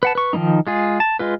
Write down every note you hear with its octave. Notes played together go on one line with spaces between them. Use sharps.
B4 F#5 A5
B4 C#6
D#3 F3 A#3 B3 D#4
G#3 F4 G#4
A5
G#3 F4 B4